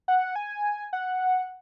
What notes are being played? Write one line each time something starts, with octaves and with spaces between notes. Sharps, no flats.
F#5
G#5
F#5